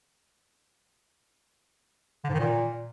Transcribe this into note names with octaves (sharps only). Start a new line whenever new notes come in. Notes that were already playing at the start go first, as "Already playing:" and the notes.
D3
G#2
D#3
A#2